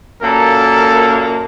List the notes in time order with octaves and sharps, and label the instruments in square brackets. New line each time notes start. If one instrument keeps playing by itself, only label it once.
[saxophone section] F#2 A#2 A#3 [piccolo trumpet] A4